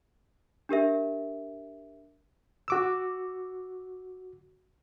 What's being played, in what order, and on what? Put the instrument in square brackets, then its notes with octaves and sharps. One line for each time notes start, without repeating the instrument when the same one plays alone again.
[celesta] D4 G4 A#4 E5
[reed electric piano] F#4 D6 E6